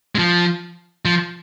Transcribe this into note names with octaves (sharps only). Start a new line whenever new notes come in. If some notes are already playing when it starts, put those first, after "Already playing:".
G#3
F3
F3